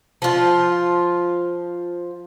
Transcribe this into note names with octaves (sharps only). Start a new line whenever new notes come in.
F3 F4